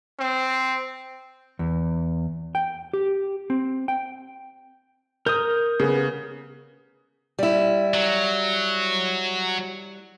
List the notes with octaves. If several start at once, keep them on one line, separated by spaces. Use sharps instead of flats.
C4
E2
G5
G4
C4
G5
A#4 D#6 G6
C#3 B3
G3 E4
F#3